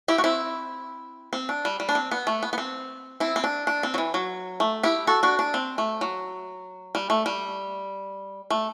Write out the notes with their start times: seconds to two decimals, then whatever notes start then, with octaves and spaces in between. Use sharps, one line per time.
0.08 E4 G4
0.18 F#4
0.24 C4 E4
1.33 C4
1.49 D4
1.65 G3
1.80 G3
1.89 D4
1.95 C4
2.11 B3
2.27 A3
2.43 B3
2.53 B3
2.58 C4
3.20 C4 E4
3.36 C4
3.44 D4
3.67 D4
3.83 C4
3.94 F#3
3.98 E3
4.14 F#3
4.60 A3
4.83 E4 G4
5.07 F#4 A4
5.23 D4 F#4
5.39 D4
5.54 C4
5.78 A3
6.01 F#3
6.95 G3
7.10 A3
7.26 G3
8.50 A3